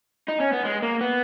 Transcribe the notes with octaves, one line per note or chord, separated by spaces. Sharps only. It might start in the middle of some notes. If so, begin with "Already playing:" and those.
D#4
C#4
B3
G#3
A#3
B3